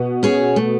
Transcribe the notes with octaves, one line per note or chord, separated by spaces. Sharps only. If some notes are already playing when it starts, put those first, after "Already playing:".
Already playing: B2 B3
C#4 G#4 C#5
A3